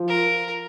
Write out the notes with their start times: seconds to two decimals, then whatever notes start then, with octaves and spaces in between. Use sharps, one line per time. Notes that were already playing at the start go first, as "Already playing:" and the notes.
Already playing: F3
0.08 A#4